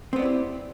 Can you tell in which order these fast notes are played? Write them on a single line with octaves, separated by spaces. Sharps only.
C4 B3 D5 E4 G4